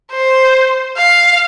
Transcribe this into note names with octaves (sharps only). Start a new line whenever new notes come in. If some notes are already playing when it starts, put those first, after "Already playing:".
C5
F5